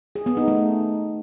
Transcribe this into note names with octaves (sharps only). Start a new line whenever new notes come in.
G#4
B3
D#4
A3